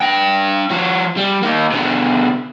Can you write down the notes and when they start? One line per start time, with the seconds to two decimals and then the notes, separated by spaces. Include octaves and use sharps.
0.01 D4 G5
0.70 F3 F#4
1.17 G3
1.43 A#3 D#4
1.71 B2 D3